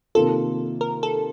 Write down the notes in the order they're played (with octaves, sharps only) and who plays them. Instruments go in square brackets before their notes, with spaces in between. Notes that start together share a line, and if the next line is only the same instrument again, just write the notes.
[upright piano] C3 D#3 A#3 F4 [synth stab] A4
[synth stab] A#4
A4